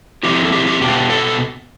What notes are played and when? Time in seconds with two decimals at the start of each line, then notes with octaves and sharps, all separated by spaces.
0.23 F3 A3 C4 E4 G4
0.45 A4
0.52 G4
0.67 G4
0.81 B2 B3 D4 F4 G4
1.10 A4